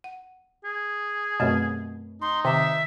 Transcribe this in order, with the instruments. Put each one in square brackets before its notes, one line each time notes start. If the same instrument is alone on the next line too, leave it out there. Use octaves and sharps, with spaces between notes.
[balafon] F#5
[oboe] G#4
[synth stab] F#2 B2 [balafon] A3 C4 G4
[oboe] D#4 [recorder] C6
[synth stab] C3 [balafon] D#3 [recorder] E5